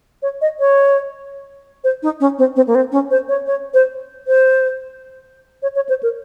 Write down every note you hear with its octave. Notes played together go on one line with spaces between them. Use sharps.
C#5
D#5
C#5
C5
D#4
C#4
C4
C4
A#3
C4
C#4
C5
C#5
C#5
C5
C5
C#5
C#5
C5
A#4